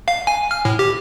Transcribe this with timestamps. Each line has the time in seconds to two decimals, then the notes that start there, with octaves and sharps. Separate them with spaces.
0.08 F5
0.27 G#5
0.51 F6
0.65 A2
0.79 G4